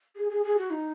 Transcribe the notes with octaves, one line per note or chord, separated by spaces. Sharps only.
G#4
G#4
G#4
F#4
D#4